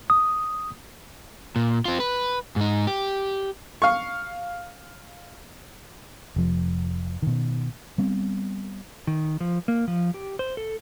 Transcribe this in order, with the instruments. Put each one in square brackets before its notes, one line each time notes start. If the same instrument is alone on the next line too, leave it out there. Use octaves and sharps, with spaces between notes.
[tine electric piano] D#6
[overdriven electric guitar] A#2
C4 F4
B4
G#2 D#4
G4
[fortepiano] F5 C#6
[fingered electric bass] F1 F3
B2 D#3
G3 B3 C4
[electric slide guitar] D#3
F3
A#3
F3
G4
C5
A4